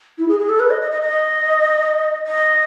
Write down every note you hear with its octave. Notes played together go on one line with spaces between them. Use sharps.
E4
G#4
G#4
A4
B4
D#5
D#5
D#5
D#5
D#5